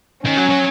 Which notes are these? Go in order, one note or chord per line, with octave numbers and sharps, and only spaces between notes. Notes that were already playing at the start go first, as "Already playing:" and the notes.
D#3 C#4
F#3
F#3